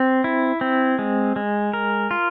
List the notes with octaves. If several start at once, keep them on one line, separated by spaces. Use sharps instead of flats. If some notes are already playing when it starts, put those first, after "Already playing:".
Already playing: C4
E4
C4
G#3
G#3
A#4
F4